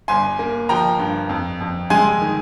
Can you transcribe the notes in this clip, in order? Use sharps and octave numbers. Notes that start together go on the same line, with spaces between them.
G1 G#5 C6
A#3
F3 G5 A#5
G2
F2
F2
G#3 G#5 C6
D#3